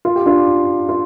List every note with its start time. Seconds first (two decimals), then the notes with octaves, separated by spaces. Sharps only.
0.05 F4
0.16 G4
0.26 D4 F4
0.89 F4